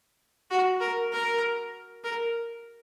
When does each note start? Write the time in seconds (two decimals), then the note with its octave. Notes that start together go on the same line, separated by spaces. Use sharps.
0.50 F#4
0.80 A#4
1.12 A#4
2.04 A#4